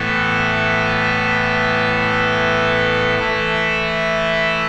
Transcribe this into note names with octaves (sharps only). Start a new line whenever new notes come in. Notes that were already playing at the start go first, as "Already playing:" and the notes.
Already playing: A2 E3 B3 A4
E3 A3 E4 A4